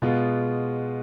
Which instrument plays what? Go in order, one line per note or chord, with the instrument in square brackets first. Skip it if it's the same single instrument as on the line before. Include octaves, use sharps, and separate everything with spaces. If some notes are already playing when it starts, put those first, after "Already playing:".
[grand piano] B2 G#3 B3 F4